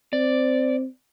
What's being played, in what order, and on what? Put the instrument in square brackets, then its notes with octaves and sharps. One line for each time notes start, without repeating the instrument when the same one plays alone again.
[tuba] C4 [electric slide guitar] D5